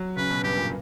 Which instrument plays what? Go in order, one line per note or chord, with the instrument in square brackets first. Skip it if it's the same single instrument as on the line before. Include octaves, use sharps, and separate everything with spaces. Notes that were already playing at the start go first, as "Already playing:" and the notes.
Already playing: [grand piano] F#3
[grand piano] C#3 [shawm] B4
[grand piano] B2
[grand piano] G2 [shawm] G4
[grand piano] A#2